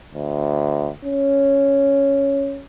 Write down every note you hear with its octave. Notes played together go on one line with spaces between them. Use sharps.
D2
C#4